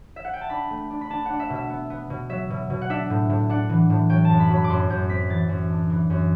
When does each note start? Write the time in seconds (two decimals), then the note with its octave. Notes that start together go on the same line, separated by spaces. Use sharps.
0.16 E5
0.24 F#5
0.33 G5
0.41 A5
0.50 D4 B5
0.70 A3
0.90 D4
1.01 B5
1.10 D4 A5
1.25 D4 F#5
1.40 E5
1.50 B2
1.55 E5
1.70 B3
1.90 B3
2.10 B2
2.29 F#3 E5
2.50 B2
2.70 B2
2.81 F#5
2.89 D4 E5
3.10 A2
3.30 A2
3.49 D4 F#5
3.69 E3
3.90 A2
4.10 F#3 G5
4.25 A5
4.30 F#2
4.40 B5
4.50 F#3 B5
4.64 D6
4.69 F#2 C6
4.90 F#2 G6
5.09 C4 B6
5.29 E3 A6
5.49 F#2
5.69 D4
5.90 E3
6.10 F#2